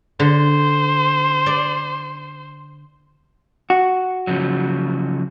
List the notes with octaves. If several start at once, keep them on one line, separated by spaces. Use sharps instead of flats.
D3 C5
D5
F#4
C#3 F3 F#3